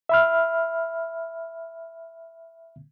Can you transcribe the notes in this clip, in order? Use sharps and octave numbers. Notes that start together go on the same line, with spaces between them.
E5 B5 F6